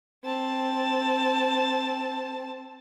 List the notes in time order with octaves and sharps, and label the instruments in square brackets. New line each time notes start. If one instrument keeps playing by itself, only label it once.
[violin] C4 A5